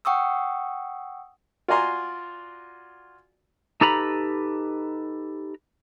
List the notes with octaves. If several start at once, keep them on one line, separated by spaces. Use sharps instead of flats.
F#5 G5 C#6 D#6 E6
F4 F#4 D5 G#5 A#5 C6
D#4 G4 A4 B4 A#5 B5